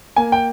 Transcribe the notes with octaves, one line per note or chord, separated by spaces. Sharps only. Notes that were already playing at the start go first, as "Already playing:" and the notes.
A#3 G#5
G5